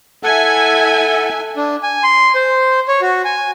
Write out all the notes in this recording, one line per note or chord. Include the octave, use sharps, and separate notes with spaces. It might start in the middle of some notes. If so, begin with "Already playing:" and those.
E4 A4 E5 F#5 G#5
D4
G#5
C6
C5
C#5
F#4
G#5